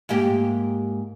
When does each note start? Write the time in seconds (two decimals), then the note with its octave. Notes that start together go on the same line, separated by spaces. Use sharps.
0.09 G#2 A#3 G4